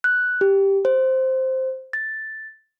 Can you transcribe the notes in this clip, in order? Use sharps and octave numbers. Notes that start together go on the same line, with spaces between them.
F#6
G4
C5
A6